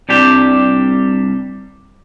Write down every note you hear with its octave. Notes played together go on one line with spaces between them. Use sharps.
C2 C3 G3 D4 G4